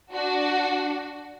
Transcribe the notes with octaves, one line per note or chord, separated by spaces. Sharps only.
D4 F#4